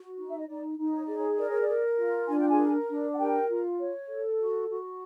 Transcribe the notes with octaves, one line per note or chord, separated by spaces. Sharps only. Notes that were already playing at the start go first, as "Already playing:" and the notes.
Already playing: F#4
D#4
E5
D#5
D#4 D5
D#4
C#5
G#4 D5
C#5
A#4 D5
C#5
D5
A#4
F4
D4 G#5
G5
G#4 G#5
A#4
D4
F#5
G4 A#4 G5
F4
C#5
A4
F#4
F#4